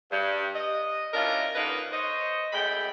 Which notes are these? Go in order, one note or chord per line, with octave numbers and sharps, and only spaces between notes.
G2
D#5
C#4 D4 E4 F4 G4 A#4
A#2 D3 D#3 A#3 D#4 B4
C5 C#5 D#5
F#2 G#3 A3 G5 B5